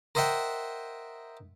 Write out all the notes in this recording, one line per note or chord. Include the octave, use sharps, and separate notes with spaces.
A#4 C5 D#5 E5 F#5 G5